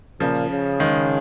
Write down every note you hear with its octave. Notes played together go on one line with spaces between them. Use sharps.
A#2 C#3 F3
C#3
D#3 G#3